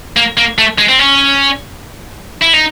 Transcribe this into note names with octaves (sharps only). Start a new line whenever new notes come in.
A#3
A#3
A3
G#3
C4
C#4
E4
D#4